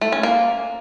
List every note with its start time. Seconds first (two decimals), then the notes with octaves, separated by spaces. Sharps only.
0.01 A3
0.12 C#4
0.23 A#3